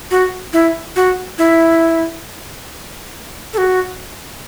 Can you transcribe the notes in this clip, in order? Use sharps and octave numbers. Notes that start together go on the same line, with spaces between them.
F#4
E4
F#4
E4
A4
F#4